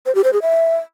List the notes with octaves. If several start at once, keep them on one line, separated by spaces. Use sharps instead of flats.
C5
G4
C5
G#4
E5